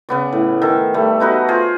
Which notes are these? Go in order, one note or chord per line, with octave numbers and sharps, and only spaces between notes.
C#3 B3 D5
A2
D#3 A4
G3 A3
B3 D#4 F#4 B4
F4 G#4 C5 D5